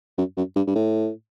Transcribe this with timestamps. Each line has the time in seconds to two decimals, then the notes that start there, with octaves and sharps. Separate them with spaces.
0.18 F#2
0.37 F#2
0.56 G2
0.67 G2
0.75 A2